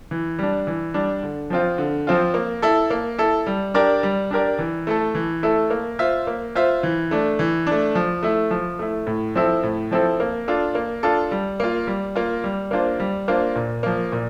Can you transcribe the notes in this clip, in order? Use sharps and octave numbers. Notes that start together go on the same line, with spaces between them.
E3
G3 D4
E3
G3 D4
D3
F3 C4 F4
D3
F3 C4 F4
A#3
E4 A4
A#3
E4 A4
G3
D4 G4 A#4 D5
G3
D4 G4 A#4 D5
E3
A3 E4 A4
E3
A3 E4 A4
A#3
F4 C5 E5
A#3
F4 C5 E5
E3
A3 D4
E3
A3 D4
F3
A3 E4
F3
A3 E4
A2
F3 C4 E4 A4
A2
F3 C4 E4 A4
A#3
D4 F4 A4
A#3
D4 F4 A4
G3
A#3 F4
G3
A#3 F4
G3
A#3 D4 F4 C5
G3
A#3 D4 F4 C5
A#2
F3 A#3
A#2